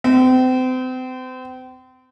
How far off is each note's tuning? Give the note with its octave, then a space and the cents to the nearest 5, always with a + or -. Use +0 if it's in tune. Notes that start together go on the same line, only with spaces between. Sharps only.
C4 -35